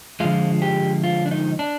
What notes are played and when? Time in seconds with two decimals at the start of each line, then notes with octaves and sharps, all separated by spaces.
0.20 D3 F3 G#3 F4
0.62 G4
1.04 F4
1.26 D4
1.31 D#4
1.59 D4